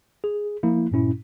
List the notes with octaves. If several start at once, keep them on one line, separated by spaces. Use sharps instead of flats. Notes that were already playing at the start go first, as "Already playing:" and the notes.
G#4
F3 A#3 E4
G2 A#2 C#4 E4